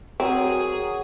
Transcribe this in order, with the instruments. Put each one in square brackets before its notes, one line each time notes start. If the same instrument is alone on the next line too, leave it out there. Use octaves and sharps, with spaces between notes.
[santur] F#3 A#4 [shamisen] C4 [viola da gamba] G#4